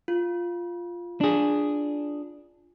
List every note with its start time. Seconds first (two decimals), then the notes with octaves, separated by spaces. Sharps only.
0.08 F4
1.21 D4 G#4